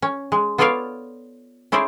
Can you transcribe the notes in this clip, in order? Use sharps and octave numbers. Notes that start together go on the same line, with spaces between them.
C#4
G#3
B3 F4 A4 C#5 D5 F5
C#4 E4 G#4 C5 D5